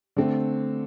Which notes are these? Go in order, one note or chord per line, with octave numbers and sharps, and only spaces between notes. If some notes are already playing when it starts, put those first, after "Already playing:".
D3 A3 C4